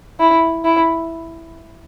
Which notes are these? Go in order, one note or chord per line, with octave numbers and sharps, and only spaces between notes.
E4
E4